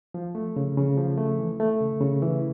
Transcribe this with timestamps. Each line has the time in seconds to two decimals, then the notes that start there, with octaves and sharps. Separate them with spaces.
0.14 F3
0.35 A3
0.56 C#3
0.77 C#3
0.97 F3
1.17 A3
1.39 E3
1.60 A3
1.80 C#3
2.01 C#3
2.22 E3